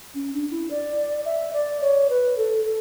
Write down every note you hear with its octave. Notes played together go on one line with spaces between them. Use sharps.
C#4
D4
E4
D5
E5
D5
C#5
B4
A4
A4